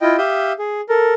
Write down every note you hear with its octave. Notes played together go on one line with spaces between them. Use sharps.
E4 F4 D#5 G5
G4 E5 F5 D#6 G6
G#4
A4 A#4